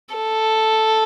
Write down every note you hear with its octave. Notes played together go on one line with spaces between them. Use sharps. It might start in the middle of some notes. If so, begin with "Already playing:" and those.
A4